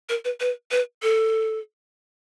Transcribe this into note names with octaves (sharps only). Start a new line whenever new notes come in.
A#4
B4
B4
B4
A4